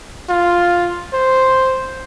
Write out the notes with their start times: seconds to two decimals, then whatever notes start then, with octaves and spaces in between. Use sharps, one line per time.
0.29 F4
1.13 C5